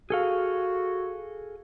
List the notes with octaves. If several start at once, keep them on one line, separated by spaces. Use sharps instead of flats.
F#4 G#4 A4 F5